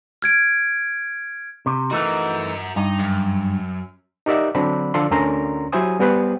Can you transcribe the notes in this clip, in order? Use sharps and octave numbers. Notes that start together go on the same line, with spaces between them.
F6 G#6 D7
C3
E3 A3 D#4 F#4 A#4
G2 D#4
F#2
D#4 G4 A#4 D5 E5 F#5
D3 F#3 C4 D4 B5
D3 F3 A4 D5 F5 C6
D2 D3 C#4 A#4 A#5 C6
F#3 E4 G4 C5 G#5 D#6
G3 B3 G#4 B4 C5 G5